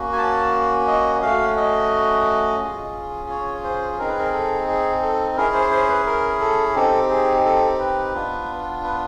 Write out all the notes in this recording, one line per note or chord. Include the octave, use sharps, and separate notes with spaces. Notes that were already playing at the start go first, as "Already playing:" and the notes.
Already playing: A#3 C#4 F#4
G#5
A5
D#5
A3 C#4 F#4 F5
D#5
C#4 F4 G#4
C#5
C5
C4 D#4 G#4 A#4
B4
A#4
A4
G#4
A4
C#4 E4 G#4 A#4
C5
C5
B4
A#4
A4
C4 D#4 G4 A4
G#4
A4
B4
B3 D4 F4
B4